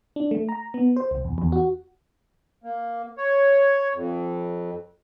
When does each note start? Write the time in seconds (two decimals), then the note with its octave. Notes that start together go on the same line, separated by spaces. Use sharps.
0.16 D4
0.31 A3
0.49 A#5
0.74 B3
0.97 C5
1.11 C2
1.25 E2
1.38 E2
1.52 F#4
2.64 A#3
3.17 C#5
3.94 F2